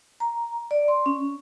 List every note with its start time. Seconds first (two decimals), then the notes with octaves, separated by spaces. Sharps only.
0.20 A#5
0.71 D5
0.88 C6
1.06 C#4